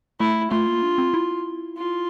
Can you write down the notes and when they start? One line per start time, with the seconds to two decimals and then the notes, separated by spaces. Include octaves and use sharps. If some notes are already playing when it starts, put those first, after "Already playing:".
0.20 A3 E4
0.51 A3 F4
0.67 A#3
0.83 D4
0.98 C4
1.14 E4
1.77 F4